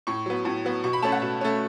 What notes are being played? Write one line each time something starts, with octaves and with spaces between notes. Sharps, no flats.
A2 C#6
F#3 B3
A2
F#3 B3
B2 C#6
B5
A3 C#4 A5
F#5
B2
A3 C#4